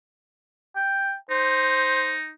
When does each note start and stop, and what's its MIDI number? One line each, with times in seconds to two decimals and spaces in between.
0.76 1.15 79
1.31 2.32 63
1.31 2.15 72